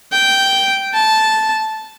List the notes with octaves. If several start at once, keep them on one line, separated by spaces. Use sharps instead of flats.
G5
A5